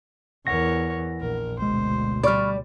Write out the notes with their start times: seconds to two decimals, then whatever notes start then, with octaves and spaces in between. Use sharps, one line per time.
0.47 E2 E3 A#4 C#5 F#5 A#6
1.21 A#1 A#4
1.59 G1 D2 B2 G#3 C5
2.23 G3 D5 B5 C#6 F6